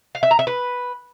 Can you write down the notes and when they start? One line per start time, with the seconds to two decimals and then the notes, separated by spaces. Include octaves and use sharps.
0.15 F5
0.23 E5
0.31 A#5
0.39 E5
0.47 B4